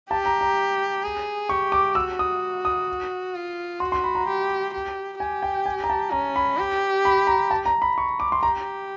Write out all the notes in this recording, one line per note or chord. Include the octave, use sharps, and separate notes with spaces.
G4 A5
A#5
A#5
G#4
G4 C#6
D6
F#4 E6
D#6
D#6
F4
F#4 C6
C6
B5
A#5
G4
G4
G4 G#5
G5
G#5
A#5
A5
C#4 A#5
B5
G4
B5
A#5
A5
A#5
B5
C#6
D6
C6
G4 A#5